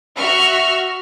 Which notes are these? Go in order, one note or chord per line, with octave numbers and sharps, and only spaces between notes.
F#4 E5 C#6 F6